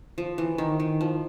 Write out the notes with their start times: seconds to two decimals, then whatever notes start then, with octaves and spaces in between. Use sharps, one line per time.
0.18 F3
0.38 E3
0.58 D#3
0.80 D#3
1.01 F3